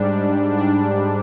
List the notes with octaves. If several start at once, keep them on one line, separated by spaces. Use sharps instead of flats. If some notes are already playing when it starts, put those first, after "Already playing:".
Already playing: G#2 G3 D4
D4